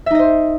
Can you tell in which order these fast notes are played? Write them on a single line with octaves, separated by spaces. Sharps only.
E5 D#4 D#5 C5